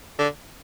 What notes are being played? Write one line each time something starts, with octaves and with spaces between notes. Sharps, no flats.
D3